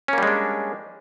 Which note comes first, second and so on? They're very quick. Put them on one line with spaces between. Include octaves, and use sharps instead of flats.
C#4 A#3 G3 G#3 D4